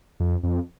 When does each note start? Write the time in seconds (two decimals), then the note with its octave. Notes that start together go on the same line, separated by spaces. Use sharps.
0.20 F2
0.43 F2